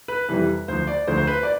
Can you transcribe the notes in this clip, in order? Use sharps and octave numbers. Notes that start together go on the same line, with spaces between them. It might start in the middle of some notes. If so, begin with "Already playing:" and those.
B4
F2 C3 E3 G3 B4
D2 D3 F3 C5
D5
D2 D3 F3 C5
C5
B4
D5